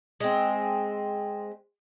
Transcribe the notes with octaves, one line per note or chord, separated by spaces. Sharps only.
G#3 C4